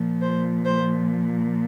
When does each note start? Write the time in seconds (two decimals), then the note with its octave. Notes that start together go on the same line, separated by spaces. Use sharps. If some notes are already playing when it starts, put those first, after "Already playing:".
Already playing: A#2 F3
0.21 C5
0.66 C5